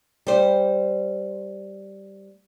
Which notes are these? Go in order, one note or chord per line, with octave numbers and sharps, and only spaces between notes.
G3 C5